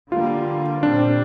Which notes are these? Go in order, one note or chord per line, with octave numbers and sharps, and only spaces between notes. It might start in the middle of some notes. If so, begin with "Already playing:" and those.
D3 G3 A#3 F4
A#2 G3 C4 D4